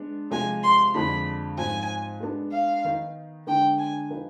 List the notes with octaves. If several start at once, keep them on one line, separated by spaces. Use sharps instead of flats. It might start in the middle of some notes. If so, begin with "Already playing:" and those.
Already playing: G#3 B3 D4
C3 F3 G#3 G#5
C6
F2 D3 F3 G#3 D4 B5
G#2 F3 C4 G#5
G#3 B3 D4
F5
D#3 B3 D#4
D3 G#3 B3 D4 G5
G#5
F3 B3 D#4 B4